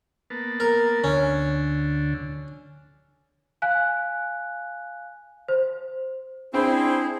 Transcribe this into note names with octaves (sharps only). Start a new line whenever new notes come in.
A#3 B3 A5
A#4
D2 D3 C#4
F5 G#5 F#6
C5
C4 D4 E4 G#4 C5 G5 B5